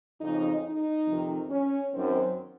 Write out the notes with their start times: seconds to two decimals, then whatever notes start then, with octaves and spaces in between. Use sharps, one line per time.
0.21 F2 C#3 D#4
0.64 D#4
1.06 F2 C3 D#3
1.49 C#4
1.92 F#2 D#3 C4